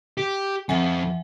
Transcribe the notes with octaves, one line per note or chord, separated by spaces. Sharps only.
G4
F2 E5 F#5 G#5